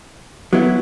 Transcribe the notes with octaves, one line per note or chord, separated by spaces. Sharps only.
F#3 B3 E4